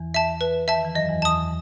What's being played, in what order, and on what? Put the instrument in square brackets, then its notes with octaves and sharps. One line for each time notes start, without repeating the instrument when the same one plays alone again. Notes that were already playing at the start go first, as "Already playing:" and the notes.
Already playing: [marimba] E2 E3
[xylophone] E5 A5
B4
E5 A5
[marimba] D#3
E3
[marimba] F#2 F#3 [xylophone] D#5
[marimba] E2 E3
[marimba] E2 E3 [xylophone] A5 D#6